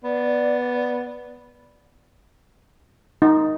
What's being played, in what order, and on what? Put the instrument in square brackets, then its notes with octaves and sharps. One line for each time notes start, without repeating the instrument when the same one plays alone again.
[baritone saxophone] B3 [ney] D5
[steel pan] D#4